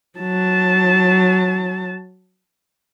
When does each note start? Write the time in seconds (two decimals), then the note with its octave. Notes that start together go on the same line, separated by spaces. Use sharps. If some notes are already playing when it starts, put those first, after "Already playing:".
0.19 F#3 A5